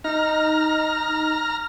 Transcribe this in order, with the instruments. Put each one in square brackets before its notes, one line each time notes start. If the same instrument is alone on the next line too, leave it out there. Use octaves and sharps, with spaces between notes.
[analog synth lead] D#4 [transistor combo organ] A#5 F6